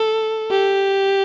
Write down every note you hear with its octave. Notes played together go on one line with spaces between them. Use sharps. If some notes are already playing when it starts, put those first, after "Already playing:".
Already playing: A4
G4